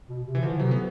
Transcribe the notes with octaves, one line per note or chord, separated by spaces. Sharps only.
B2
C3
E3
D3 F3
C3 F#3
B3